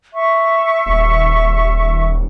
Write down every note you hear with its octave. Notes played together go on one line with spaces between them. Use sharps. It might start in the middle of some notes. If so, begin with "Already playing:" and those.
E5 C#6
D#1